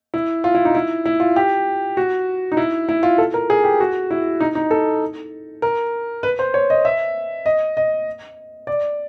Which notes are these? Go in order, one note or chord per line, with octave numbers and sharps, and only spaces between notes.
E4
F4
E4
D#4
E4
E4
F4
G4
F#4
D#4
E4
E4
F4
A4
A#4
G#4
G4
F#4
E4
D#4
D#4
A4
A#4
B4
C5
C#5
D#5
E5
D#5
D#5
D5